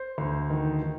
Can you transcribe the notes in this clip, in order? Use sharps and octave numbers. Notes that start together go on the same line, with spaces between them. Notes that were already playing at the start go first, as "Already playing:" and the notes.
Already playing: C5
D2
D#3
D#3